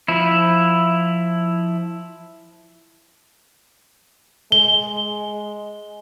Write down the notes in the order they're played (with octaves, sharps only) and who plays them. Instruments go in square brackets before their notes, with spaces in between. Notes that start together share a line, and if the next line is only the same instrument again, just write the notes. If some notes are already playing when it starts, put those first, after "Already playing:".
[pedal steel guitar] F3 E4
[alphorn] G#3 [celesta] G7